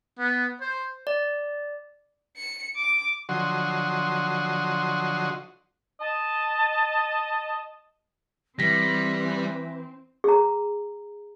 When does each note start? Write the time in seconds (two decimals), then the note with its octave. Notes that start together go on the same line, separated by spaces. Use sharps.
0.19 B3
0.61 C5
1.07 D5
2.36 C#7
2.76 D6
3.29 D3 F3 F#3 F#4 D#5 C6
6.00 D#5 A5
8.59 E3 G3 C4 A#6 B6
10.24 G#4 A#5